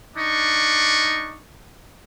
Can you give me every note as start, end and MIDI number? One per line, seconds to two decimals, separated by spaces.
0.17 1.42 62
0.17 1.42 63
0.17 1.42 85